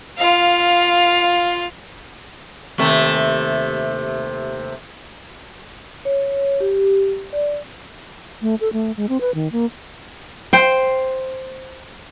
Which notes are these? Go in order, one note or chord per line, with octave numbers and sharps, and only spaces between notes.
F4 F5
D#2 C3 A3
C#5
G4
D5
A3
A4
A3
G#3
C4
B4
D#3
A#3
C5 G5